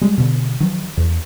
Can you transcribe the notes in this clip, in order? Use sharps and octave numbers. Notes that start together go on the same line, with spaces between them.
G3 G#3
B2 D3
D#3 F3 F#3
E2